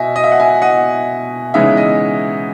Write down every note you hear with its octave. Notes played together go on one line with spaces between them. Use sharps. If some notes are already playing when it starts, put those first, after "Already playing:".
Already playing: B2 D#5 E5 G#5
D#5
E5
F#5
E5 G#5
D#5 F#5
C#3 E3 G#3 B3 D#4 E5
D#5